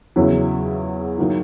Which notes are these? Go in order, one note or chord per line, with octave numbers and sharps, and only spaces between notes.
E2 C#3 F#3 C#4 E4
D#3 F#3 A#3 E4